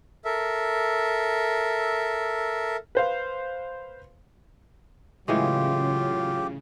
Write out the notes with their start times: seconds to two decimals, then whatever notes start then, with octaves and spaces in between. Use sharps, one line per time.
0.25 A4 A#4 E5
2.95 B4 C5 F5
5.28 A2 C#3 E3 F#3 G#3 F4 G4